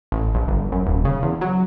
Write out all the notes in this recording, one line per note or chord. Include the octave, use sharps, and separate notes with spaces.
A1
A#1
G1
F#2
D#1
C#3
E2
F#3